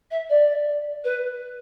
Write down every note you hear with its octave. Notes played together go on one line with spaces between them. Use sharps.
E5
D5
B4